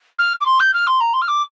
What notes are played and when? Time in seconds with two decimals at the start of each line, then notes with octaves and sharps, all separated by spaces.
0.18 F6
0.40 D6
0.45 C6
0.59 G6
0.73 F6
0.87 C6
1.00 A#5
1.13 C6
1.21 F6
1.28 D6